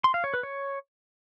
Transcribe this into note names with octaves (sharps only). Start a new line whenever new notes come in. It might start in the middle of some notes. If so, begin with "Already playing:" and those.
C6
F5
C#5
B4
C#5